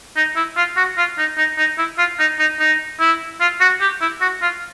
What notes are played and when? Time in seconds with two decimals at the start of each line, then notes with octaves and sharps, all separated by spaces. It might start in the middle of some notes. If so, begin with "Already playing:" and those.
0.16 D#4
0.36 E4
0.57 F4
0.77 F#4
0.97 F4
1.18 D#4
1.38 D#4
1.58 D#4
1.78 E4
1.98 F4
2.19 D#4
2.39 D#4
2.59 D#4
3.00 E4
3.41 F4
3.61 F#4
3.80 G4
4.01 E4
4.21 F#4
4.42 F4